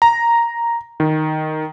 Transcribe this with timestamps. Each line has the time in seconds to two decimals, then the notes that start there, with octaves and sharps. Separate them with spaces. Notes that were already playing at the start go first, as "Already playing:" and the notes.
0.02 A#5
1.00 D#3